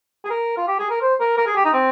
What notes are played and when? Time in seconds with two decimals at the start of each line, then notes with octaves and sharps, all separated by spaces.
0.25 G#4
0.30 A#4
0.57 F4
0.68 G4
0.79 G#4
0.90 A#4
1.02 C5
1.20 A#4
1.37 A#4
1.47 G#4
1.56 G4
1.65 D#4
1.73 C4